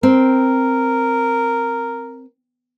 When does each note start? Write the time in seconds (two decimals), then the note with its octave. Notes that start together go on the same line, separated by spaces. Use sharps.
0.03 C4 A#4